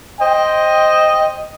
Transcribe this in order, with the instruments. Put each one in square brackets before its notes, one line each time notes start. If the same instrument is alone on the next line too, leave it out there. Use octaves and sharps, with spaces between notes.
[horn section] C5 G5 [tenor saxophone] D#5